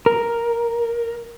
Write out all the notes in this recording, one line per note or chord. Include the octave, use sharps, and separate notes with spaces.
A#4